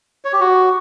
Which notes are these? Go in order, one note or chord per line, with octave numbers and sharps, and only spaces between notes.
C#5
G4
F#4